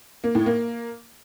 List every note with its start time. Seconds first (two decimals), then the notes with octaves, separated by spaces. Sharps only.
0.24 A#3
0.35 A2
0.46 A#3